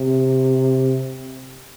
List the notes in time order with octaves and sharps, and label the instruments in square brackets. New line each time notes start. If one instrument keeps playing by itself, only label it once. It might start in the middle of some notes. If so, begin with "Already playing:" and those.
Already playing: [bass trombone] C3